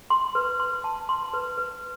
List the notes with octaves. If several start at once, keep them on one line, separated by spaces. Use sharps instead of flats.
C6
B4
C6
A5
C6
B4
B4